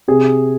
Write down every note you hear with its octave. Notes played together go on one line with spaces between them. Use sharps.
C3 G#4